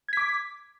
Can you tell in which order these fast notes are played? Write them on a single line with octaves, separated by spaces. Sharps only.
G#6 B6 D6